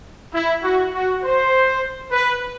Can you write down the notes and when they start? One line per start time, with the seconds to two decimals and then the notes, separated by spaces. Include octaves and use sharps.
0.33 E4
0.63 F#4
0.93 F#4
1.23 C5
2.11 B4